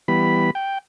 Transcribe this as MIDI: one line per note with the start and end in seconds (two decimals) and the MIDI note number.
0.08 0.51 52
0.08 0.51 55
0.08 0.51 59
0.08 0.51 83
0.55 0.78 79